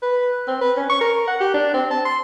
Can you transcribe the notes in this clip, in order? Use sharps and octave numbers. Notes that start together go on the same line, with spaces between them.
B4
C4
B4
C#4
C#6
A#4
F#5
G4
D4
C4
A5
C6